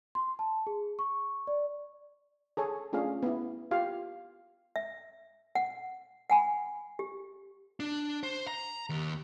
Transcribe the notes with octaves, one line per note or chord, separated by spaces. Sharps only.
C6
A5
G#4
C#6
D5
G#4 A4 C#5 G#5
A3 C#4 D4 F4 G#4 F5
B3 E4
F4 G4 F5
E5
F#5
F#5 G#5 B5
G4
D4
C5
A#5
D#2